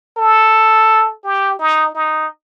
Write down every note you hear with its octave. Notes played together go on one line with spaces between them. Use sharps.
A4
G4
D#4
D#4